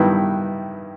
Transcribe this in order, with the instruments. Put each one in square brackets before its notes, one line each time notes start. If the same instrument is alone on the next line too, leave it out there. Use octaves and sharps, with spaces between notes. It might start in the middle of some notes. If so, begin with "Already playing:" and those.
Already playing: [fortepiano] G2 D#3 G3 B3 E4